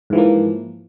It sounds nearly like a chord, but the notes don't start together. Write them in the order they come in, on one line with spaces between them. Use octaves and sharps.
G#2 E3 F3 A#3